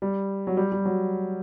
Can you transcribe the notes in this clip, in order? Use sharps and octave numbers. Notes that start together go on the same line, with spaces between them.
G3
F#3
G3
G3
F#3